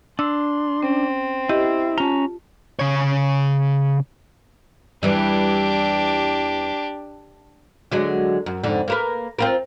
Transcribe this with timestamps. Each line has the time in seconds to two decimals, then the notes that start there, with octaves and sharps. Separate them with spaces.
0.19 D4 C6 E6
0.83 C4 C#4
1.49 E4 G4 C5 D#5
1.98 C#4 F4 A5 A#5
2.79 C#3 C#5
5.03 E2 E3 G3 D4 G4
7.91 D3 F#3 G#3
8.46 F#2
8.64 F2 G#2 D3
8.88 A#3 A#4 B4
9.39 C4 F4 A#4